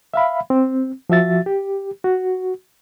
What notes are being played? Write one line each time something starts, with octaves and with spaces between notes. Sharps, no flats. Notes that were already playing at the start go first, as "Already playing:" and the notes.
E5 F5 B5
C4
F3 F#4 E5 A6
G4
F#4